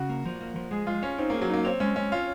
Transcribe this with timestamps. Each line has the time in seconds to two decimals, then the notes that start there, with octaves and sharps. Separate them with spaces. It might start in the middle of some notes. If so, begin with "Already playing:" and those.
Already playing: C#3 F#4
0.09 A#3
0.26 F3
0.41 A#3
0.56 F3
0.71 G#3 G#4
0.87 G#3 F4
1.03 C#4 C#5
1.18 C4 D#4
1.30 A#3 G#4
1.42 F#3
1.49 A#3 D#4
1.65 C4 C#5
1.80 G#3 C#4
1.96 G#3 C#4
2.12 F4 C#5